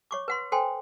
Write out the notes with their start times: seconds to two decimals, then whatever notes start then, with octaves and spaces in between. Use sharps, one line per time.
0.11 C#5 C#6 D6
0.28 B4 F#5 C6
0.52 A4 C5 G5 G#5 C6